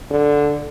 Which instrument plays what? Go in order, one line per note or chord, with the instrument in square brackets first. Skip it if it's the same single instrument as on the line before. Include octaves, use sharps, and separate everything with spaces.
[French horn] D3